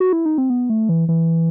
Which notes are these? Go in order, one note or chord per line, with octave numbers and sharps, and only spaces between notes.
F#4
E4
D#4
C4
B3
A3
E3
E3